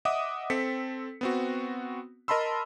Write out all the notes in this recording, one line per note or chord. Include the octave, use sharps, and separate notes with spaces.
D#5 E5 F#5 D6 D#6
C4 A4 B6 C#7
B3 C4 F#4
A#4 D#5 A5 B5 C6 E6